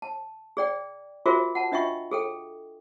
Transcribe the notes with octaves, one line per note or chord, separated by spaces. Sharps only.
A5
G#4 D5 G5
F4 F#4 G#4 A#4 C5 E5
F#5 A5
D4 F4 D#5 E5 G5 C#6
G#4 A4 G5